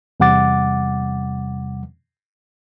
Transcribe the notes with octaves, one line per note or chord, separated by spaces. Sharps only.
E2 C3 G3 F#5 D6 A6